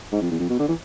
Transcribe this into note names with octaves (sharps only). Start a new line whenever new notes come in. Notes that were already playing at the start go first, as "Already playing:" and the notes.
G#2
F2
E2
F2
B2
D3
E3